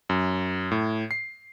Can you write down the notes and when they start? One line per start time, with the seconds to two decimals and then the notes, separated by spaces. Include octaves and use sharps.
0.09 F#2
0.71 A2
1.11 C7